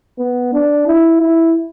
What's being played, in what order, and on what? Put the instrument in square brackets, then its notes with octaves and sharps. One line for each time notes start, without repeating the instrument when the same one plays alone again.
[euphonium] B3
D4
E4
E4